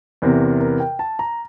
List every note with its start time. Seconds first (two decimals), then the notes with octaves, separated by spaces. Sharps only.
0.22 E2 C3 E3 A#4
0.60 A#4
0.80 G5
0.99 A5
1.19 A#5